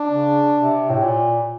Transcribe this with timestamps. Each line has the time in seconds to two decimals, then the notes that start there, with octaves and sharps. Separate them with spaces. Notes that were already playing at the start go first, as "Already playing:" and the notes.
Already playing: D4
0.10 C#3
0.55 C3
0.90 A2
1.03 A#2